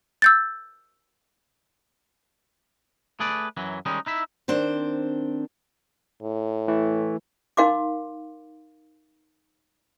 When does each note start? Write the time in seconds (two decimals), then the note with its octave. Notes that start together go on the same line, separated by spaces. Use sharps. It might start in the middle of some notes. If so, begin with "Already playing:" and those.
0.22 E6 G6 A6
3.20 A3 G#4 B4 D5
3.57 F#2 E3 F#3
3.86 D#3 G3 G#3 C#4 D#4
4.06 D#4 E4 E5
4.48 D#3 C4 D4 C5
6.23 A2
6.68 E3 A3
7.57 D#4 A#4 F5 C6 D6